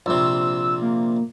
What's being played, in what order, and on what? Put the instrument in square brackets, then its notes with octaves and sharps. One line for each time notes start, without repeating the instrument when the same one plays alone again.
[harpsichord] A#1 C3 [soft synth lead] E6
[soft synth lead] A#3